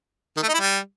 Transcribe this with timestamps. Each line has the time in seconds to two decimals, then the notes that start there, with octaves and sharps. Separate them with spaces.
0.37 D#3
0.43 A3
0.48 D#4
0.54 E4
0.60 G3